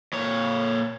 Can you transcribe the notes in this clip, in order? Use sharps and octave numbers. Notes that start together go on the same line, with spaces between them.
A#2 C#5